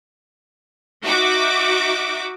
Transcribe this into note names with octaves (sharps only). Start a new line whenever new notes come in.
D#4 F#4 E5 D6